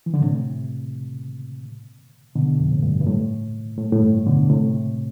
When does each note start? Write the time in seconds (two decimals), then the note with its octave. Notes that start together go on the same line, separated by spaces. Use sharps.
0.06 E3
0.14 D3
0.22 A2 C3
2.35 B2 D3
2.60 F2
2.72 A2
2.83 G2
3.01 G2
3.07 A2
3.78 A2
3.92 A2
4.01 G2
4.26 B2 D3
4.50 A2 C3